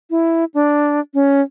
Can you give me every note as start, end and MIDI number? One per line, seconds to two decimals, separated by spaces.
0.10 0.45 64
0.54 1.00 62
1.14 1.41 61